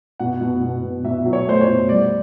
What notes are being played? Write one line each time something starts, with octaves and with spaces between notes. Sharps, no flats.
B2 F#5
B2
B2
B2
B2 E5
F#3
C#5
A3 C5
C#5
B2
G3 D5